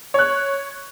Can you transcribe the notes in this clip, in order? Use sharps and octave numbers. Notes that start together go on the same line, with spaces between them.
C#5 F#6